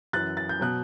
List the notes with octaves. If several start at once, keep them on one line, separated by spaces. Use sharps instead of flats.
F#2 E3 F#6 A6
A6
G6
B2 F#3 F#6